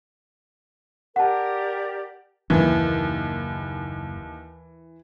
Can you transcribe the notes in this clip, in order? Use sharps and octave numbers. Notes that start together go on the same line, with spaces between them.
G4 A#4 D5 F#5 A5
F#1 D#2 E3